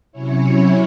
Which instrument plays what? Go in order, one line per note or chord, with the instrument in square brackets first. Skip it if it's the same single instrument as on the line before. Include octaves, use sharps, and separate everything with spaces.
[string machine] C3 F#3 C#4 E4 C#5